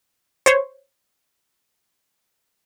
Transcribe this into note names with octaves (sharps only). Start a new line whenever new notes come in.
C5 C#5